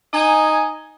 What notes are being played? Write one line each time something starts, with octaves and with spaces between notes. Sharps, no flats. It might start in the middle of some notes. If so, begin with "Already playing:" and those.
D#4 D#5 G#5